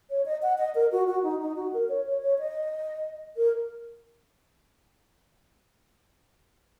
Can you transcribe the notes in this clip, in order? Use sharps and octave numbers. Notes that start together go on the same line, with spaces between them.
C#5
D#5
F#5
D#5
A#4
F#4
F#4
D#4
D#4
F#4
A#4
C#5
C#5
C#5
D#5
A#4